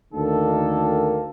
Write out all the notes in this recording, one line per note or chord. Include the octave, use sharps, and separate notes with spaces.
D2 D#3 A#3 A4